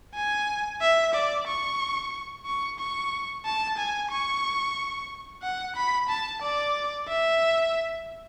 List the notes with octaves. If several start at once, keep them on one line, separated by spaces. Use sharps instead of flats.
G#5
E5
D5
C#6
C#6
C#6
A5
G#5
C#6
F#5
B5
A5
D5
E5